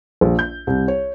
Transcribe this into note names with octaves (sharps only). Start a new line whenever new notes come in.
A#1
G6
C2
C#5